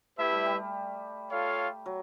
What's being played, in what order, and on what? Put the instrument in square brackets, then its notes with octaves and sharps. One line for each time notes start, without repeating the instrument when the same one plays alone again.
[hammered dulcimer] A3 [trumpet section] E4 G4 B4 E5
[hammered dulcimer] G3
G3
[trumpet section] F4 A4 C#5 F5
[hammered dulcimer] F#3